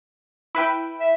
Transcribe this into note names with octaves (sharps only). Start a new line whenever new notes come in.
E4 B4 G5
E5